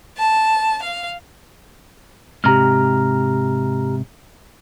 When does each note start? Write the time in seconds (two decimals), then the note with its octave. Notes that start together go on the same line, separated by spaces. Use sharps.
0.16 A5
0.82 F5
2.44 G#2 C3 G4 A#5 F6